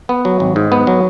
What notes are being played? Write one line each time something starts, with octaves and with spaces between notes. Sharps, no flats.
B3
F#3
G#1
G#2
B3
F#3